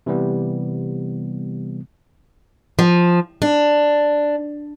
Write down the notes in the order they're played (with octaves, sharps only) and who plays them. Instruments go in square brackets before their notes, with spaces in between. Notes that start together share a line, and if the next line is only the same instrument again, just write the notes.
[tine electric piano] C3 E3 G3 B3
[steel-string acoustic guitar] F3
D4